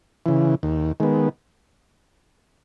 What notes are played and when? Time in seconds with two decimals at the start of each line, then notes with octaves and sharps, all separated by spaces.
0.26 C#3 E3
0.63 D#2
1.00 D#3 G#3 B3